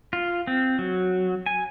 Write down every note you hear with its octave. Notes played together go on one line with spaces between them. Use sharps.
F4
C4
F#3
G#5